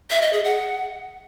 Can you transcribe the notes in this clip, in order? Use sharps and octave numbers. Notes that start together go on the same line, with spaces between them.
E5
D#5
G#4
F#5